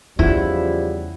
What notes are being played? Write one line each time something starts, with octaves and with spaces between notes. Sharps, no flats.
E2 C#3 F3 G3 E4 F4 F#5